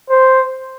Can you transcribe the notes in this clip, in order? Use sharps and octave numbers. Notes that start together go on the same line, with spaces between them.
C5